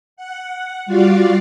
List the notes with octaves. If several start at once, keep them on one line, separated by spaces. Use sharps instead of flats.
F#5
G3 F4 F#4 D5 F5